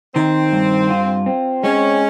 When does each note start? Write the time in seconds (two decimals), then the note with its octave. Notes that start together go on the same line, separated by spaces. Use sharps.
0.15 D#3 C4
0.52 G2
0.90 F4
1.26 C4
1.63 G#3 C#4